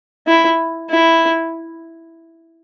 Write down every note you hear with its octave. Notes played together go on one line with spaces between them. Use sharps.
E4
E4